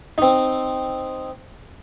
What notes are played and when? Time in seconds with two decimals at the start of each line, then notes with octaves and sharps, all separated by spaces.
0.18 C4 D#4